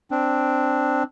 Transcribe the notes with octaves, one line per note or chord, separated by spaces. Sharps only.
C4 D4